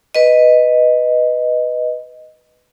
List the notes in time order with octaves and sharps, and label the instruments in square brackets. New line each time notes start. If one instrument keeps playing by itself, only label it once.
[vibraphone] B4 D#5